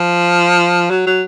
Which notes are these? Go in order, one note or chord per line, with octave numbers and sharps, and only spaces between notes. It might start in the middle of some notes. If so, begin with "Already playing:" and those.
Already playing: F3
F#3
F#3